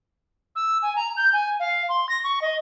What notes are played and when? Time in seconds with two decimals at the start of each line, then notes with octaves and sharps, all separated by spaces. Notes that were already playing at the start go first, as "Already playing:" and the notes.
0.56 E6
0.82 G#5
0.96 A#5
1.17 G6
1.33 G#5
1.60 F5
1.89 C6
2.09 A#6
2.24 C#6
2.42 D#5